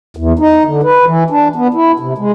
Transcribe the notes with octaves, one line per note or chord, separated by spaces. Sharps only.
E2
D#4
D3
B4
E3
D4
B3
E4
C3
G#3